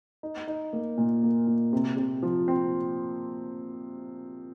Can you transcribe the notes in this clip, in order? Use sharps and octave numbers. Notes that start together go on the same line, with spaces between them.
D#4
D#4
A#3
A#2
A#3
A#2
C3
C3
F3
C4